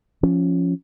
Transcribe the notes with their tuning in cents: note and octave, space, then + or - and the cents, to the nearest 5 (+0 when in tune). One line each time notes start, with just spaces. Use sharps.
F3 +0 C#4 +0